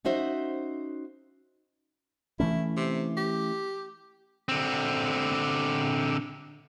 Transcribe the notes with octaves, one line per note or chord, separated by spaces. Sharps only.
C#4 D#4 F#4 C5 E5
E3 A3 C#4 E4
C3
G4
D3 C4